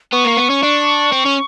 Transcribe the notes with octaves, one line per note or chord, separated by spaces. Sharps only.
B3 C#6
A#3
B3
C#4
D4
C4
C#4